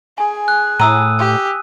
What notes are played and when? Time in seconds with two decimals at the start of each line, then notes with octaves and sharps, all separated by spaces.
0.18 G#4 G#5
0.48 F#6
0.80 A2 A#5 D#6 E6 D#7
1.19 G4